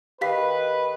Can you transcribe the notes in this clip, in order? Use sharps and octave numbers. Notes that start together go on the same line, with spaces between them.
D#3 G4 B4 F5 B6